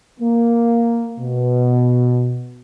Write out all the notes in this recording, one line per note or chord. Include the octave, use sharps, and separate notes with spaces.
A#3
B2